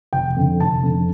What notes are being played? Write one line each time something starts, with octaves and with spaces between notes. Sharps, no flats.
F1 G5
F2 D3
F1 A5
F2 D3